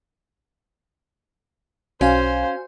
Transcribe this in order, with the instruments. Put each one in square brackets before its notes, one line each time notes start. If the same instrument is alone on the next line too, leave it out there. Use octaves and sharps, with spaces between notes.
[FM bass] B1 [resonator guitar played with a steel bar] C#4 [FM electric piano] F#4 F5 G#5 [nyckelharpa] C5